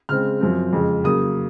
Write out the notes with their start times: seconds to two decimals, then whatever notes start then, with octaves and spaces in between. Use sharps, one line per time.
0.09 C#3 G#3 C4 F6
0.41 F#2 F3 C4
0.73 F2 C#3 G#3
1.04 C#3 F#3 A#3 D#6